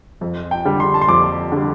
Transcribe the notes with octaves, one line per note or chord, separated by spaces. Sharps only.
F2
G5
D3 G3
C6
A5
C6
F2 D6
D3 G3